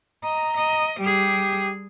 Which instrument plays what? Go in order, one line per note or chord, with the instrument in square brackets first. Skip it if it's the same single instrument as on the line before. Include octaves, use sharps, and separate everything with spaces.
[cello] D#5 [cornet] A#5
[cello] D#5
[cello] G3 G#4 [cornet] G4